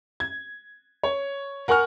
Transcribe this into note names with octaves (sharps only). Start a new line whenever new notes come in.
G#6
C#5
A#4 F#5 G#5 C#6 F6